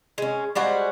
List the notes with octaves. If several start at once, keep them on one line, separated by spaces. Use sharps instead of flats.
G#3 C#4
G3 G#3 F#4 C5